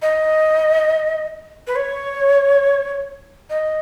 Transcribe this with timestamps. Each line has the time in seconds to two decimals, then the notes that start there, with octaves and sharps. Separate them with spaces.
0.02 D#5
1.67 B4
1.76 C#5
3.50 D#5